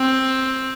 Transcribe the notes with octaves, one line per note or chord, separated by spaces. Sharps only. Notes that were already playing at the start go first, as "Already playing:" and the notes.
Already playing: C4